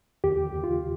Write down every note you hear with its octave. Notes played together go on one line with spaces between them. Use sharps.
D#2 G4
D#2
F4